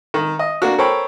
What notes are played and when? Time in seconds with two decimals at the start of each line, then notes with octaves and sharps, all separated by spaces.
0.14 D#3
0.39 D#5
0.62 A#3 D4 F#4
0.78 A4 A#4 C5 C#5 G5 B5